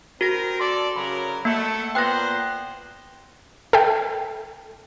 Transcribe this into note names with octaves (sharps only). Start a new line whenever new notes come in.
C4 F#4 A#4 A#6
A4 D5 C6
C#3 F#3 A#4 B5
A3 A#3 A4 E5 F#5
A#2 B3 C5 G5 C6 F#6 A#6
A4 E5 G5